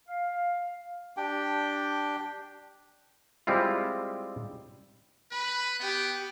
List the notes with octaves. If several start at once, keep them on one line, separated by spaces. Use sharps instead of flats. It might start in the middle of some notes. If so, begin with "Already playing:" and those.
F5
D4 G4 G5
G3 G#3 C4 E4 F4
B4 B5
B3 G4